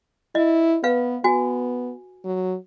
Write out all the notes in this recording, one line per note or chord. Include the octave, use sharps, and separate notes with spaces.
E4 D#5
B3 B4 F5
B3 F#4 G#5
F#3